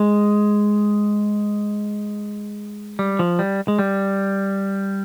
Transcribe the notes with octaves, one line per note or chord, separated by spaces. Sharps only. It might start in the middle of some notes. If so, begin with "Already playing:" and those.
Already playing: G#3
G3
F3
G3
G#3
G3